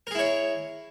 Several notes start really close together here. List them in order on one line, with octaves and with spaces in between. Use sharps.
A#4 G#4 E4 C#5